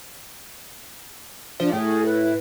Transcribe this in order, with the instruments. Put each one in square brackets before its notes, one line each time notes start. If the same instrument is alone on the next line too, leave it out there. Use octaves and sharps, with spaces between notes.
[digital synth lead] F3 [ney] D4
[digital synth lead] A2 [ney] G#4
[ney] B4